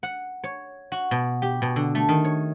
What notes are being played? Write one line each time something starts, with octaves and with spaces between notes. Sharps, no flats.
F#5
C#5
F#4
B2
G4
B2
D3
A3
D#3
C#5